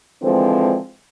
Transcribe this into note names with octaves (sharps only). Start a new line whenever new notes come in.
D3 E3 F3 G#3 C4